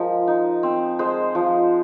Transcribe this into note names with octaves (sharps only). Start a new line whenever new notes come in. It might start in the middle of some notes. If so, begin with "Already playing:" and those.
Already playing: F3 G#3 A#4
D#4
C4
G#3 C5
F3